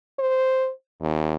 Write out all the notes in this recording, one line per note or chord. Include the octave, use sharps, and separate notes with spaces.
C5
D#2